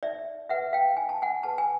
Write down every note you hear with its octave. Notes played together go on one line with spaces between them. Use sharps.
D#4 D5 E5
G#4 B4 E5 F#5
F5 G5
D#4 G#5
A5
F#5 G#5
G#4 B4 A5
G#5